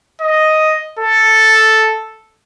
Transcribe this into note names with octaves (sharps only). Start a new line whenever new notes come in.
D#5
A4